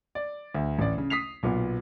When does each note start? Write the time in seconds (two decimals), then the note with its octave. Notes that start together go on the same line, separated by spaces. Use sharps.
0.15 D5
0.55 D2
0.79 A1 D5
0.98 C#3
1.10 D#6 B6 C7 F7
1.43 B1 A#2 B3